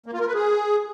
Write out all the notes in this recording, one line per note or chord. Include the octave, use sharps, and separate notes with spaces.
A#3
F4
A#4
B4
G#4